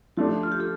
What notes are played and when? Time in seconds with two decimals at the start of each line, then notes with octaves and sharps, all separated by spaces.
0.17 F3 A3 D4 G4
0.43 F4
0.52 G4
0.60 F4 A4